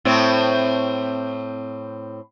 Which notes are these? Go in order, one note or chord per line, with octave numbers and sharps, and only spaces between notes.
A2 C4